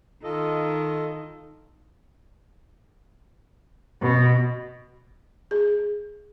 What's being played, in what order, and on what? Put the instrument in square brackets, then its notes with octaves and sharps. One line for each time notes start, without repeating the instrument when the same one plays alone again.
[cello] D#3 [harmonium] F4 A4 D#5
[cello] B2
[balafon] G#4